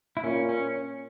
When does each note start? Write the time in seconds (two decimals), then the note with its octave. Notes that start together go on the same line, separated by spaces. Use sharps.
0.17 E4
0.24 A#2 C#4
0.49 C#4